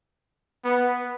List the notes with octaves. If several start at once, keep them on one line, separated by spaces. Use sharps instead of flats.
B3